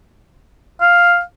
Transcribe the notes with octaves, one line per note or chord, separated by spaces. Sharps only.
F5